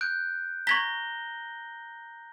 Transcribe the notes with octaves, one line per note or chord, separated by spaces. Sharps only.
F#6 G6 D7
A#5 C#6 G#6 A#6 B6 G7